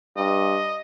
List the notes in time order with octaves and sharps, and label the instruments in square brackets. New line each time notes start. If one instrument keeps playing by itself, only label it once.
[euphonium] G2 [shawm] D#5